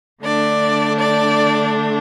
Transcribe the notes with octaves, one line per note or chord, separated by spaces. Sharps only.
D3 A3 D4 D5
D5